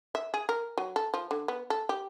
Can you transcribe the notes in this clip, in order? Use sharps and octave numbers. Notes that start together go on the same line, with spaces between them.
E5
G#4
A#4
F#3
A4
F3
D3
B3
A4
G4